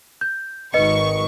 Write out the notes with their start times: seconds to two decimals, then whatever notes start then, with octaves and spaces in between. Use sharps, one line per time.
0.21 G6
0.74 G#1 D#3 B4 D#5 C#6 C#7